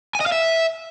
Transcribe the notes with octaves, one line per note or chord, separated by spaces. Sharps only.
G#5
D#5
F5
E5